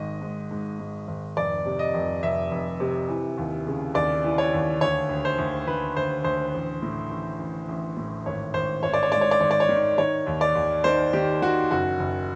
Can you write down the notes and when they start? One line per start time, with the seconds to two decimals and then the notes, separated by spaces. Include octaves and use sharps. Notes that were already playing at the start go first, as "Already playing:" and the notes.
Already playing: G#1 G#2 D#5
0.21 G#2
0.51 G#2
0.79 G#2
1.08 G#1
1.37 F1 D5
1.65 C3
1.79 D#5
1.94 F1
2.23 F1 E5
2.51 F1
2.80 C3
3.09 E3
3.38 D#2
3.67 C#3
3.94 D#2 D5
4.24 E3
4.38 C#5
4.53 D#2
4.81 D2 C#5
5.09 D2
5.25 C5
5.38 D2
5.67 D2 B4
5.96 D2 C5
6.24 D2 C5
6.53 A1
6.82 A2
7.10 A1
7.39 A1
7.69 A1
7.97 A2
8.26 G#1 C#5
8.54 G#1 C5
8.83 G#1 C#5
8.94 D5
9.03 C#5
9.12 G#2 D5
9.21 C#5
9.31 D5
9.40 G#1 C#5
9.51 D5
9.60 C#5
9.69 D#3
9.98 D#3 C#5
10.26 D#2
10.41 D5
10.55 D#2
10.84 D#3 C5
11.13 D#3 G4
11.42 D#3 F#4
11.71 F#1 F#4
11.99 F#1